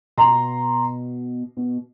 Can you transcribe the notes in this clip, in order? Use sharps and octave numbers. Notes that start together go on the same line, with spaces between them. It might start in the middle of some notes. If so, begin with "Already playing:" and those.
B2 A#5 C6
B2